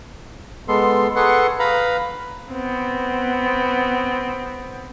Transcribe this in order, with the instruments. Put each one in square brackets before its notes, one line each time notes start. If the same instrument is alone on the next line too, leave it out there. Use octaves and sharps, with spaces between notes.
[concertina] G#3 B3 A4 C6
G#4 A4 B4 F#5 C6 C#6
B4 F5 A#5 B5
[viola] B3 C4